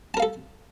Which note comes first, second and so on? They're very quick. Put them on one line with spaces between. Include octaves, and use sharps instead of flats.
A5 A#4 F5 A4